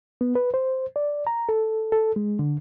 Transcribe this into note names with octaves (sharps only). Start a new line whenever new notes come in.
B3
B4
C5
D5
A#5
A4
A4
G#3
D3